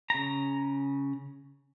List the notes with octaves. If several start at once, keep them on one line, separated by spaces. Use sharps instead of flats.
C#3 A#5